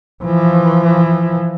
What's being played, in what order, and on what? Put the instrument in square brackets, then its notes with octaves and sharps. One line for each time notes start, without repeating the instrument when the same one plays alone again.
[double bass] E3 F3